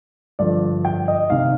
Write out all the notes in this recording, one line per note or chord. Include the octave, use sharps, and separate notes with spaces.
G2 D3 F3 D5
G5
D#5
C3 D#3 F5